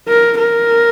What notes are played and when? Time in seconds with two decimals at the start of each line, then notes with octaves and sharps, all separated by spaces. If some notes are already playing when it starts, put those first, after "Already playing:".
0.08 A#4
0.39 A#4